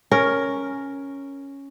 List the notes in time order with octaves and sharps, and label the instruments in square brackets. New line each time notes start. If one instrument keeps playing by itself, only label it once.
[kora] C#4 A#4